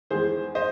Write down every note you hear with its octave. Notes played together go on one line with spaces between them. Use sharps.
E2 D#3 G#3 G#4 C5
C5 D#5